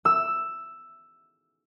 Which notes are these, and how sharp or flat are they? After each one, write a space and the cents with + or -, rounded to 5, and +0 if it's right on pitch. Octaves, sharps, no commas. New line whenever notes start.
E6 +5